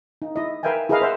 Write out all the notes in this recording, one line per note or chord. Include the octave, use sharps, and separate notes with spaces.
D#4
E4 D#5
A#4 B4 E5 F5 G5 G#5
E4 G#4 A#4 B4 D#5 F5
C5 E5 F#5